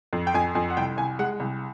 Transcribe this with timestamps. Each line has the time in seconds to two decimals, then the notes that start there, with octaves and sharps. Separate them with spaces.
0.13 F2
0.27 G5
0.34 F2 G#5
0.55 F2 G#5
0.70 F#5
0.77 C2 G5
0.97 C2 G#5
1.19 G#3 F#5
1.40 C2